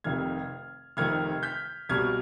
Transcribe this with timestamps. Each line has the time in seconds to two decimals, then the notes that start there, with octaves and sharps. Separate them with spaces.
0.04 F1 F2 C3 D#3 F6 G#6
0.97 F1 F2 C3 D#3 F6 G#6
1.43 G6 B6
1.89 C2 B2 G3 F6 G#6